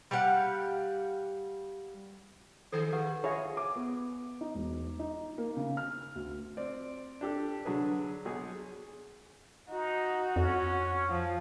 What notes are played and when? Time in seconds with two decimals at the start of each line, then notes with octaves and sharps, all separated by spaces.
0.11 G3 G4 F5 F#5
2.72 D#3 G#4 A4 C5
2.93 G4 B4 F#5
3.24 F4 G#4 C#5 E5 B5
3.57 D6
3.76 B3
4.41 D#4
4.55 E1
4.99 D#4
5.38 A#3
5.57 C#3
5.77 F6
6.16 D2
6.57 C4 D5
7.21 D4 G4 A4
7.65 D3 F#3 D4 G#4 B4
8.25 B1 G#4
9.69 D#4 F#4
10.36 F2 C#4
11.10 F3